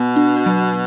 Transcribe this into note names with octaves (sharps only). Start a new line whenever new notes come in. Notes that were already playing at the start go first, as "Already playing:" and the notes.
Already playing: B2 B3
D4
F#3